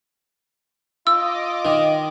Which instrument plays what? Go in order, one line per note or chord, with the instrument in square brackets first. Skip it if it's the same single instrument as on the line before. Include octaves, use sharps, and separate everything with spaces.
[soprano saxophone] F4 [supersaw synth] D#5 D6 [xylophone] E6
[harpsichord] D#3